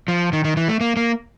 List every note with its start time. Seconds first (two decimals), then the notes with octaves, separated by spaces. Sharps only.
0.08 F3
0.33 D#3
0.44 D#3
0.57 E3
0.69 A3
0.81 A#3
0.97 A#3